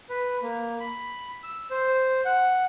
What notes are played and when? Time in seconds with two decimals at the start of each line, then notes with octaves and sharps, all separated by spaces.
0.10 B4
0.43 A#3
0.80 B5
1.43 E6
1.70 C5
2.25 F#5